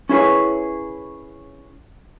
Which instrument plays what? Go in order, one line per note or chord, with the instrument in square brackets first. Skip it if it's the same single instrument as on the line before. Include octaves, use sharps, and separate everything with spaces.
[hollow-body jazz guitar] C#4 E4 G#4 B4 C#5